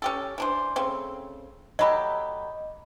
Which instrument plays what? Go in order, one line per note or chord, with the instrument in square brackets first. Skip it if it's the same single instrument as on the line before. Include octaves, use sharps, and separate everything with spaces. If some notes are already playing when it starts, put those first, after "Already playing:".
[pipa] C#4 G4 A4
E3 D4 C5
C#3 A3 C4
[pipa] F#3 A3 G4 [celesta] D#5 B5